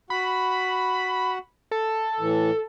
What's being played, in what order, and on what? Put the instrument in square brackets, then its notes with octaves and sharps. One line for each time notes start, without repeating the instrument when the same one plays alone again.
[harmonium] F#4 F#5 [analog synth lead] B5
[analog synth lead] A4
[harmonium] A2 E3